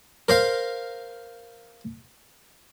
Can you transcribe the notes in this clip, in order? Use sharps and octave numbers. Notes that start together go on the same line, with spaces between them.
A#4 C5 F5